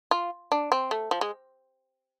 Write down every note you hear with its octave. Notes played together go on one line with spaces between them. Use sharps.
F4
D4
C4
A3
F3
G#3